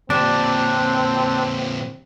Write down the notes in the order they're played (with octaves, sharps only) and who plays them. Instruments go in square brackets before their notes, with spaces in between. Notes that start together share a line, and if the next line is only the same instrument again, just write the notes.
[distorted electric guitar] A#2 D3 [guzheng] G3 [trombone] C4 [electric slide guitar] D4